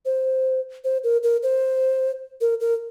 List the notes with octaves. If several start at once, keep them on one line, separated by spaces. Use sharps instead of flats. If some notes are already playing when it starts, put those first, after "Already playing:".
C5
C5
A#4
A#4
C5
A#4
A#4